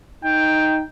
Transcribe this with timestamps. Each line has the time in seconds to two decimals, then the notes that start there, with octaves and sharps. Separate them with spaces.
0.24 D#4 G5